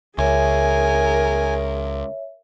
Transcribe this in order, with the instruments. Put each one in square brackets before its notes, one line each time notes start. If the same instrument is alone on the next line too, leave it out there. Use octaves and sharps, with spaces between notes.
[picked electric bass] C#2 [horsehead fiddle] G#4 A#4 [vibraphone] C#5 E5 [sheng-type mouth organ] G#5